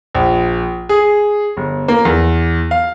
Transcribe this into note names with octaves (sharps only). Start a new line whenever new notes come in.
A#1
G#4
G1
A#3
E2
F5